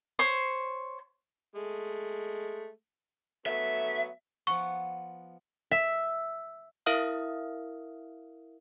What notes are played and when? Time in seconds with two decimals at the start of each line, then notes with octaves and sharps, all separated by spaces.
0.19 C5 C#5 C6
1.55 G#3 A3
3.46 F#3 A3 B3 E5
4.47 F3 B3 F#5 C#6
5.71 E5
6.86 E4 A#4 E5 F5 D#6 F6